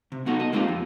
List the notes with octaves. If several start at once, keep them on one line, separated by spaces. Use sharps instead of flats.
C3
B3 D#4 F#4 A4
D#5
G#3 A#3 C4 D#4 F4 G4
F2